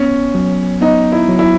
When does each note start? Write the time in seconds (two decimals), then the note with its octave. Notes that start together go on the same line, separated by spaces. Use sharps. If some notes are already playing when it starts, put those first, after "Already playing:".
Already playing: B3 C#4
0.35 F#3
0.81 B3 D#4
1.12 E4
1.29 F#3
1.39 E4